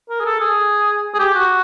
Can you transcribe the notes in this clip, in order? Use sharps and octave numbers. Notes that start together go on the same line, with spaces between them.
A#4
G#4
A4
G#4
G#4
G4
F#4